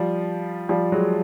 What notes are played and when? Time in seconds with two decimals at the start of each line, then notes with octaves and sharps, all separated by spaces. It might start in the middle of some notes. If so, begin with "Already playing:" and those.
Already playing: F3 G3
0.69 F3 G3
0.92 F#3 G#3